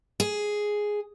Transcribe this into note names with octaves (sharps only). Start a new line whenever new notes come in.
G#4